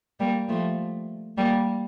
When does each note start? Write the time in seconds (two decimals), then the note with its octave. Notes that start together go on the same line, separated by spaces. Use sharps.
0.20 G3 A#3
0.49 F3 A3
1.37 G3 A#3